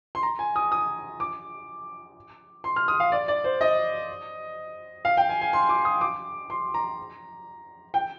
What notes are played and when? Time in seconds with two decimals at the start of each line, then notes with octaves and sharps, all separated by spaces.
0.15 C6
0.23 A#5
0.39 G#5
0.56 D#6
0.72 D#6
1.20 D6
2.64 C6
2.76 F6
2.88 D#6
3.00 F5
3.12 D5
3.28 D5
3.44 C5
3.61 D#5
5.05 F5
5.17 G5
5.29 G#5
5.41 G#5
5.53 C6
5.69 D6
5.85 D#6
6.01 D6
6.50 C6
6.74 A#5
7.94 G5